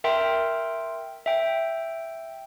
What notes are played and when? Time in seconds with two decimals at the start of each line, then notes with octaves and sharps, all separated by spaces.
0.04 A#4 E5 G5 C6
1.26 E5 G5